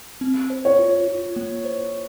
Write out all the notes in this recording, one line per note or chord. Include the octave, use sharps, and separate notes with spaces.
C4
C5
C#5
F4
F4
A#3
C5